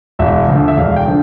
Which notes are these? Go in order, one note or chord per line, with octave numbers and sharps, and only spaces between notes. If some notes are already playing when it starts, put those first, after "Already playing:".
E1 E5
D2 D3 F3
E5
E1 F5
G5
D3 F3